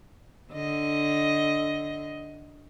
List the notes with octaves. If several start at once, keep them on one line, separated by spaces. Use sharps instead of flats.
D3 D#5